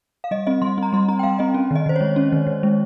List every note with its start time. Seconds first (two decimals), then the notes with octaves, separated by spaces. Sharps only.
0.24 F5
0.31 G3 D#5
0.47 C4 D#5
0.62 G3 C6
0.78 C4 A#5
0.93 G3 C6
1.08 C4 A#5
1.19 G5
1.23 G3 F5
1.39 C4 D#5
1.54 C#4
1.71 D#3 D#5
1.86 D#3 C5
1.96 G#3 C#5
2.16 C#4
2.32 D#3
2.47 D#3
2.63 G#3